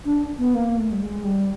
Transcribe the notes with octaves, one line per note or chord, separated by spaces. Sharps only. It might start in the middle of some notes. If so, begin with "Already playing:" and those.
D4
B3
A#3
A3
G3
G#3
G3